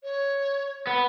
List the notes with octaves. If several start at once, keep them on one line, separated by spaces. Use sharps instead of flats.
C#5
B3